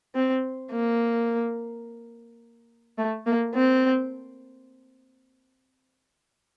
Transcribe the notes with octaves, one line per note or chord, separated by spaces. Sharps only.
C4
A#3
A3
A#3
C4